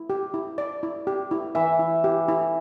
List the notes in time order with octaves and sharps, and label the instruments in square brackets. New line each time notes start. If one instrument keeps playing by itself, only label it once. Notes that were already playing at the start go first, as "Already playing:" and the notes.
Already playing: [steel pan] E4
G4
E4
D5
E4
G4
E4
[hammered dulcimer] E3 [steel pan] E5
[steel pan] E4
G4
E4